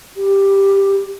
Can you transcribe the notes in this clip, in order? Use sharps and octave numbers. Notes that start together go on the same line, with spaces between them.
G4